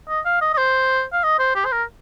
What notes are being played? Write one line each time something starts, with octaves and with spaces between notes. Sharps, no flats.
D#5
F5
D#5
D#5
C5
F5
D#5
C5
G4
C5
A#4